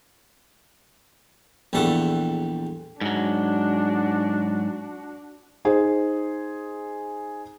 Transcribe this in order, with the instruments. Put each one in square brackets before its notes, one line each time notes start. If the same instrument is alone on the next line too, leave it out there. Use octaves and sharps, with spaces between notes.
[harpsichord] A#1 E2 G3 A3 A4 F#5
[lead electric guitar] G#2 F#3 [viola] D4 F#4
[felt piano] D#4 G#4 C5